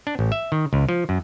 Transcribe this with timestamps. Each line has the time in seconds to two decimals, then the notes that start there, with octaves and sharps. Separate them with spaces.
0.07 D4
0.19 A1
0.32 E5
0.52 D#3
0.73 C#2
0.89 F3
1.09 F#2